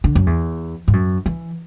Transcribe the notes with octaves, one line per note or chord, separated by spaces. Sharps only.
D3
F#2
E2
G#2
F#2
E3